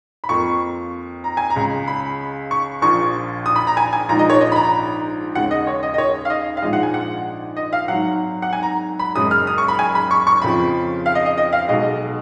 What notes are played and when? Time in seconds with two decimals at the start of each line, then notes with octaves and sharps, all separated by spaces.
0.24 B5
0.29 F2 F3 A#3 C#6
1.24 A#5
1.37 G#5
1.50 A#5
1.56 C#2 C#3 G#3
1.88 B5
2.51 C#6
2.82 A#1 A#2 F3 C#6
3.46 D#6
3.56 B5
3.67 A#5
3.77 G#5
3.93 G#5
4.09 A#1 G#2 F3 A#5
4.19 D#5
4.30 C#5
4.41 D#5
4.52 B5
4.56 A#5
5.35 D#2 C#3 G#3 F#5
5.51 D#5
5.67 C#5
5.83 D#5
5.94 D#5
5.98 C#5
6.25 F5
6.30 D#5
6.57 F5
6.62 A#1 G#2 F3 G#3 D#5
6.73 F#5
6.83 G#5
6.94 F#5
7.57 D#5
7.73 F5
7.88 G#1 G#2 F#3 F#5
8.42 F#5
8.53 G#5
8.63 A#5
8.99 B5
9.15 F#1 F#2 C#3 G#3 D#6
9.31 F6
9.47 D#6
9.58 C#6
9.68 B5
9.79 G#5
9.95 B5
10.11 C#6
10.27 C#6
10.42 F2 C#3 F3 B5
11.06 F5
11.15 D#5
11.26 D#5
11.38 D#5
11.53 F5
11.68 B1 B2 G#3 D#5